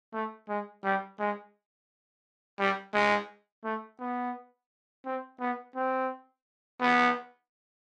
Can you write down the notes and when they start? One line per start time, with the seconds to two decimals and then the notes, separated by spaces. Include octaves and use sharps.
0.13 A3
0.48 G#3
0.84 G3
1.19 G#3
2.59 G3
2.94 G#3
3.64 A3
4.00 B3
5.05 C4
5.40 B3
5.76 C4
6.81 B3